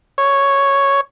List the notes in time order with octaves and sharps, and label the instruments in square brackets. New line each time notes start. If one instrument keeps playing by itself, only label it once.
[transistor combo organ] C#5